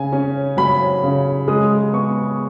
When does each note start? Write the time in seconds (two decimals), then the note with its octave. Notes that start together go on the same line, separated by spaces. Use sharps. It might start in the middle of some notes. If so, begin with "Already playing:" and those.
Already playing: C#3 G#5
0.12 C#4
0.57 F#3 B5
1.03 C#3
1.48 G#3 D#6
1.93 B3 C#6